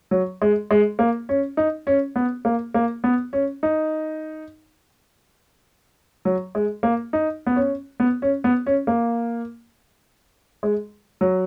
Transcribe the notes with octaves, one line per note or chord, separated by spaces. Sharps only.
F#3
G#3
G#3
A#3
C#4
D#4
C#4
B3
A#3
A#3
B3
C#4
D#4
F#3
G#3
A#3
D#4
B3
C#4
B3
C#4
B3
C#4
A#3
G#3
F#3